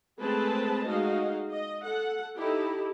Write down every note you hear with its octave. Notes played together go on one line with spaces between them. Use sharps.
G#3 A3 C4 G#4 B4 A5
G#3 D#4 F#4 D#5 F5
D#5
A4 F#5
D#4 E4 G4 A4